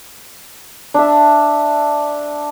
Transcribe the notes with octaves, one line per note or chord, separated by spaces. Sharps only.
D4 E5